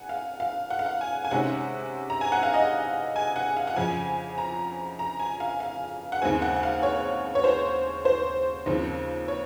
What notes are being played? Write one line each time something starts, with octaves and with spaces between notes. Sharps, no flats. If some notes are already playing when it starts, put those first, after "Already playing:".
Already playing: F#5 G#5
F5
F5
F#5
F5
F#5
G#5
G#5
C3 D#3 G#3 C#4 F#5
A#5
G#5
F#5
F5
D#5
G#5
F#5
F5
F#5
F2 C#3 F3 G#5
A#5
A#5
G#5
F5
F5
F#5
D#2 C#3 G#3 C4 G#5
F#5
F#5
F5
C#5
C#5
C5
C5
D#2 C#3 F3 C4
C#5